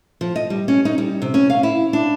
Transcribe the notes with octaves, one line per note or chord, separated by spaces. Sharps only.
F3
D#5
G3
C#4
D#4
G3
C3
C#4
F5
E4
D4